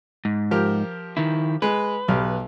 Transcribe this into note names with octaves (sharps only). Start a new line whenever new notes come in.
G#2
F3 G4 A#4
D#3 E4
G#3 B4
B1 G4 F6